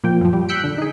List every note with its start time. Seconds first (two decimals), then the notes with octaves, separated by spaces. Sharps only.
0.03 A#2 F3 G5
0.21 F#2 F3
0.33 G3
0.48 E6 F#6 G6 B6 C#7 D7
0.63 D3
0.78 D#4 G#4